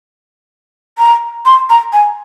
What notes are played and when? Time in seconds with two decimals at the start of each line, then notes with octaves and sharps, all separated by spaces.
0.98 A#5
1.45 C6
1.69 A#5
1.92 G#5